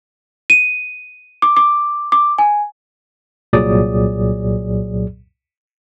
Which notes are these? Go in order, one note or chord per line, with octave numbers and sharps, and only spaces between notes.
D#7
D6
D6
D6
G#5
C2 A#2 F#3 G#4 D5 D#6